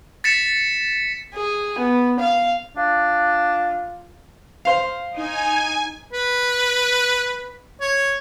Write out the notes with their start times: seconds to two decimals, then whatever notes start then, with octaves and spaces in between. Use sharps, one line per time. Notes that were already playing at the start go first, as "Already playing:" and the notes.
0.24 A6 B6 C#7 E7
1.34 G#4
1.78 B3
2.19 F5
2.77 D4 F4
4.65 C5 F5
5.15 D#4 G#5
6.13 B4
7.81 C#5